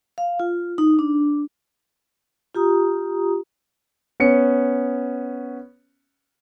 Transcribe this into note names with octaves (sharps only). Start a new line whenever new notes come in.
F5
F4
D#4
D4
F4 G4 A#5 D#6
B3 C#4 C#7